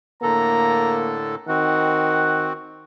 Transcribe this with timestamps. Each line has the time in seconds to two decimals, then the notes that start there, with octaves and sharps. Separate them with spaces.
0.23 A2 D3 A#3 A4 A#5
1.48 D#3 C4 F#4 F#5